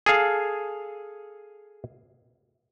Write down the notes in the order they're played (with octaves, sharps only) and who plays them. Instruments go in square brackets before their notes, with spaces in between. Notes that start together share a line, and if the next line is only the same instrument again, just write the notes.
[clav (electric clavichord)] G#4 A4 F5